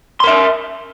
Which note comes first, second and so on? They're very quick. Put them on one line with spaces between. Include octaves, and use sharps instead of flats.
C6 A#4 E5